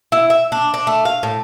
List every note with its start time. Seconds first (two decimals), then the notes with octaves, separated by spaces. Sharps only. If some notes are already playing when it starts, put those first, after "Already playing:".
0.12 E4
0.30 E5
0.52 D4
0.74 D4
0.87 A3
1.05 F5
1.23 A2